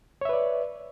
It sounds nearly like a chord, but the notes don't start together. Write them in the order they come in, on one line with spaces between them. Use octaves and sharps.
C#5 E5 B4 D5